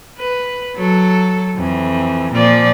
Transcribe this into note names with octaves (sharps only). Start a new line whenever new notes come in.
B4
F#3 A4
F2 E3
A#2 F3 D5